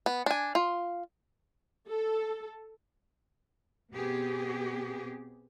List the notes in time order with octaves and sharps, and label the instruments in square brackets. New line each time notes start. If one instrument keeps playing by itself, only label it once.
[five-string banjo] B3
D4 G#5
F4
[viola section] A4
[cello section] B2 B3 C4 G4 G#4